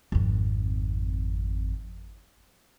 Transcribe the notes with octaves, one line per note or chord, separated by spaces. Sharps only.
G#1 F2